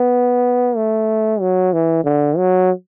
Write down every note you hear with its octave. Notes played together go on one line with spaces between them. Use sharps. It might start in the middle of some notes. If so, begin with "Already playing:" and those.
Already playing: B3
A3
F#3
E3
D3
F#3